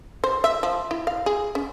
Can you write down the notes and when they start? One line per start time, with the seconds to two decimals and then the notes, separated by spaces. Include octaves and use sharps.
0.24 C5
0.44 E5
0.63 F3
0.91 E4
1.07 F5
1.26 G#4
1.55 C#4